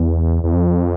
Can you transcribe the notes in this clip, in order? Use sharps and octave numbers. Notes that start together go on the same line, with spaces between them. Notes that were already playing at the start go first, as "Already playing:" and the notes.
Already playing: E2
E2
F2